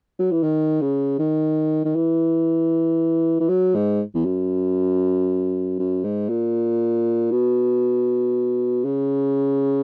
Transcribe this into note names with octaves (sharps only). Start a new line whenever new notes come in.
F#3
E3
D#3
C#3
D#3
D#3
E3
E3
F#3
G#2
E2
F#2
F#2
G#2
A#2
B2
C#3